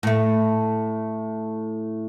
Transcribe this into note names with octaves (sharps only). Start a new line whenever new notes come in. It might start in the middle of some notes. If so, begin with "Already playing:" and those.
A2 A3